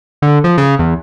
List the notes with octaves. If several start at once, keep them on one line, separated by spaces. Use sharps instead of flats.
D3
F3
C#3
E2